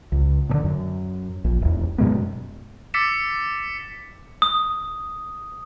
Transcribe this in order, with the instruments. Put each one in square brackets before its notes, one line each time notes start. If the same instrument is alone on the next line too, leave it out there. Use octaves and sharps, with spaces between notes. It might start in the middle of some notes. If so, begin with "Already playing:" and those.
[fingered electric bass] C#2
A#2 D3
F#2
A#1
D#1 E2
F#2 B2 G#3 B3
[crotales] D6 E6 A6 B6 C#7 E7
[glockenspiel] D#6